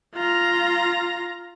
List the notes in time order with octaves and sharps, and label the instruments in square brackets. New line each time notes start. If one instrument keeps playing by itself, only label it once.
[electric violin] F4 A#5